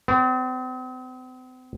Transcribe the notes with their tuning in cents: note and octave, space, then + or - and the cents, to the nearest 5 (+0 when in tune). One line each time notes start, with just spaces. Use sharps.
C4 -45 C#5 +25